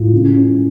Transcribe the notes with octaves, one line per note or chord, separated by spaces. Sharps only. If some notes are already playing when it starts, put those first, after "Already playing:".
Already playing: A2 F4
C#3
C#4